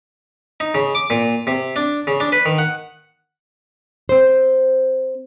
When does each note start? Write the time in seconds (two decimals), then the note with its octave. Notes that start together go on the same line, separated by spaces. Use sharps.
0.60 D#4
0.74 C#3
0.95 D6
1.10 A#2
1.47 C3
1.76 D4
2.07 C#3
2.20 D4
2.32 B4
2.45 D#3
2.58 F#5
4.09 C4 C5